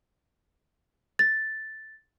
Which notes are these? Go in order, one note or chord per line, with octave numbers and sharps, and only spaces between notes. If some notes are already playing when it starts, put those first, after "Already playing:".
A6